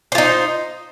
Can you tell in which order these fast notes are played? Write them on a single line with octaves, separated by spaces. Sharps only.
C5 F4 D#4